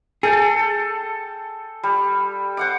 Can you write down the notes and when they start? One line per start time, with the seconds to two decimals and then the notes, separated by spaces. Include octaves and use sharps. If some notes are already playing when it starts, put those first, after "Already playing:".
0.23 G#4 A4 G5 A5
1.83 G3
2.57 C5 F#5 D6